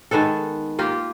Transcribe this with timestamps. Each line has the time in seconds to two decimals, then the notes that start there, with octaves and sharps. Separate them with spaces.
0.11 D#3 G#3 B3 A4
0.79 A#3 F4 G4